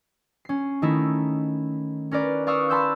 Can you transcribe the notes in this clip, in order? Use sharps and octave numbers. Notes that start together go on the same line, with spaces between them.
C#4 C7
D#3 A3 D#4 E4
C#4 A#4 B4 D5
D5 F5 C#6 D#6 E6 F#6
A5 B5 C6 E6 F#6 G6